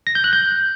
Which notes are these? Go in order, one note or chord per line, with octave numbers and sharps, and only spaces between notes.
A#6
G6
F#6
G6